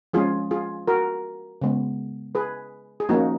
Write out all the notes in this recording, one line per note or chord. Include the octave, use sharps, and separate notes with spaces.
F3 G#3 C#4 F4 G#4
F4 G#4
F#4 A#4
C#3 G#3 B3
G#4 B4
G#4
F3 A#3 C#4 D#4 F#4